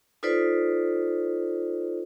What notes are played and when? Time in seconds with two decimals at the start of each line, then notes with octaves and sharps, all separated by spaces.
0.23 D#4 F4 A4 B4 C5 D5